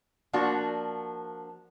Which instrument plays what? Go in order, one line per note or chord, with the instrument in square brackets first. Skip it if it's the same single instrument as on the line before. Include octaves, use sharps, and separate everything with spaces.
[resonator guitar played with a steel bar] F3 A#3 D4 F#4